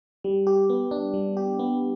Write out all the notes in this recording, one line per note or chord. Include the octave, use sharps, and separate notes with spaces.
G3
G4
B3
D4
G3
G4
B3